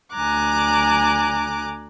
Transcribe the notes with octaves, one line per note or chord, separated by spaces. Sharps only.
D2 G#5 A#5 D6 F#6